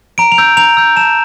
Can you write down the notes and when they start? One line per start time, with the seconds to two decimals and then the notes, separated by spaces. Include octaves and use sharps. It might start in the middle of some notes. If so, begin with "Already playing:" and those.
0.18 A#5 D7
0.32 F7
0.38 E6 G6
0.57 A#5 F7
0.77 E6 G6
0.96 A5 E7